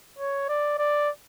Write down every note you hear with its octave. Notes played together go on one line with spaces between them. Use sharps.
C#5
D5
D5